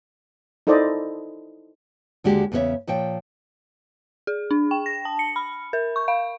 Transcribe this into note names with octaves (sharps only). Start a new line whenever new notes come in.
D#4 E4 A4 C5 D5 D#5
D#2 D3 G#3 F#4 G4
E2 C#3 B3 A4 C#5 E5
A#2 F3 C#5 G5
G#4
D4
G5
A#6
A5
C#7
B5
A#4
C#6
F5